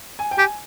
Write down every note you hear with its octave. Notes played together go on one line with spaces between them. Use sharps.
G#5
G5
G4 G#5